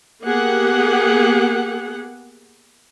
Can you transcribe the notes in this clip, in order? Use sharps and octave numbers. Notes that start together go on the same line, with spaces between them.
A#3 B3 G4 G#4 F#5